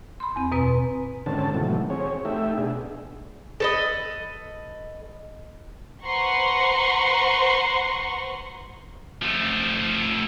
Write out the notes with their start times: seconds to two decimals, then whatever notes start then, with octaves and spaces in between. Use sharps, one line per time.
0.20 B5 C6
0.36 E2 C4
0.52 F#2 B2 C4 B4 G#5
1.26 G#2 D3 D#3 C4 C#4 A5
1.54 G#2 B2 D#3 E3 F#3 A3
1.90 C4 G#4 C#5
2.25 A3 D#4 G4 E5
2.58 B2 D4 G#4
3.60 A4 B4 D#5
6.05 B4 C5 F#5 A#5 C6 C#6
9.22 F3 A3